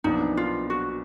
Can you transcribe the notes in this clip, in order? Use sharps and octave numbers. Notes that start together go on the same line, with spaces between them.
B1 A#2 F3 B3 D4 D#4
F4
F#4